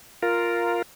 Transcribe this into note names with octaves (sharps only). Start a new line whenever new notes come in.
F4 A#4